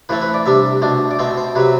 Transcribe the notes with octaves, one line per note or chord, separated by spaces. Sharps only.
A2 E3 A3 C4 B4
B4
D5
C3 G3 D4 E5
B2 A3 D4
D5
B2 A3 C4 C5
C5
C3 F#3 C4 B4